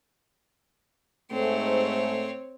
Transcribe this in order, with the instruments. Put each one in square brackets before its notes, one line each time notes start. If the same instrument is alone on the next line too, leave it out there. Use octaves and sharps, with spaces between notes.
[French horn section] G#2 A3 [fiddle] C4 C#5